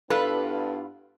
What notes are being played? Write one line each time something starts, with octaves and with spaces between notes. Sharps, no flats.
G2 B3 D4 E4 F4 A4 B4 F5